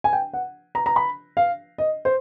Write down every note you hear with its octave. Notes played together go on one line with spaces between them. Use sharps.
G#5
G5
F#5
A#5
A#5
B5
F5
D#5
C5